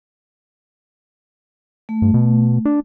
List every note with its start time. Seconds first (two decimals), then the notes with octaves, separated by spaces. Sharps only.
1.89 A3
2.02 G2
2.14 B2
2.65 D4